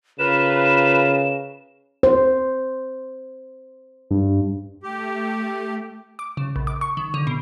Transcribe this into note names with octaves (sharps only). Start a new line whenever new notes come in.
C#3 F4 A#4 B4 E7
C5
G2
A3 G4
D6
C#3
A#1
D6
C#6
D#3
D3
B2